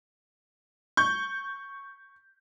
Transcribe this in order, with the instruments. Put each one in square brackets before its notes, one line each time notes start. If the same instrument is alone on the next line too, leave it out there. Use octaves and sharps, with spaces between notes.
[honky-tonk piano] C#6 G6